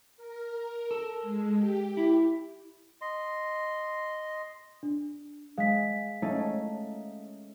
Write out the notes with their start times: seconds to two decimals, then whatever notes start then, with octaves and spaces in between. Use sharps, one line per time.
0.17 A#4
0.91 A4
1.22 G#3
1.55 G4
1.97 E4
3.01 D#5 C6
4.83 D4
5.58 G#3 F5 B6
6.22 A3 C#4 D#4